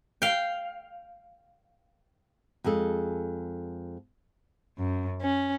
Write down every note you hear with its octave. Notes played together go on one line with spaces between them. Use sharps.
F5 G5
F2 G#3 G#4 A4
F#2
C#4